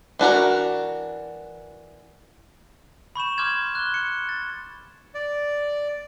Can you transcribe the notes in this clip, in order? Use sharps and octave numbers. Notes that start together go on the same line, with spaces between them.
E3 D4 F#4 A#4
B5 C#6 G6 E7
C6 D6 F6 G6 G#6 E7
F#6 G7
C#7
A6
D5